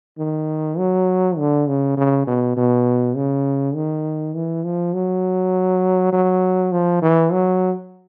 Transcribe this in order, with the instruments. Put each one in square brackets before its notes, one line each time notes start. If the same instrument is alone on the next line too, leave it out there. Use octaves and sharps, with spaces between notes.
[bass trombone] D#3
F#3
D3
C#3
C#3
B2
B2
C#3
D#3
E3
F3
F#3
F#3
F3
E3
F#3